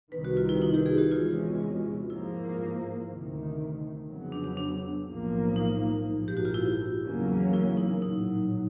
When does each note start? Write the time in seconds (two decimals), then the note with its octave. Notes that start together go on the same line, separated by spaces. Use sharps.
0.12 C2 C3 D#3 B4
0.25 F#4
0.37 F4
0.49 E4
0.62 D#4
0.74 G4
0.86 G#4
0.98 F#4
1.11 E2 C3 E3 G#3 C#4 F4
2.10 G#2 F3 A#3 E4
3.09 D2 C3 D#3
4.07 F2 C#3 F#3 B3
4.32 D4
4.44 D4
4.57 D4
5.06 B1 A2 F3 A#3
5.56 D#4
6.05 A#1 G#2 F3 A#3
6.28 G4
6.37 F#4
6.45 F4
6.54 E4
7.04 E2 C#3 F#3 A#3 C#4
7.53 E4
7.77 D#4
8.02 A#1 A2 F#3 D#4